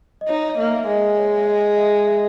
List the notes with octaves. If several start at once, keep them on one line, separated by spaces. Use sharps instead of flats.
D#5
D#4 C#5
D#5
A#3
E5
E5
G#3 D#5
C#5
E5
D#5
E5
E5